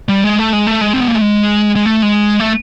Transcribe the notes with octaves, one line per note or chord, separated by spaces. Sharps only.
G3
G#3
A3
G#3
A3
G#3
C4
B3
A#3
A3
G#3
G#3
A3
G#3
A3